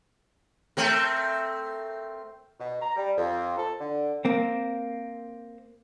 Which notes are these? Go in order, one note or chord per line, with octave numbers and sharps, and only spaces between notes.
A3 C4 A#4
B2
A#5
G3
F2
A4
D3
A#3 C4